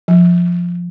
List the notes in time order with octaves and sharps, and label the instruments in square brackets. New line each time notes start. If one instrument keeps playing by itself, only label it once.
[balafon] F3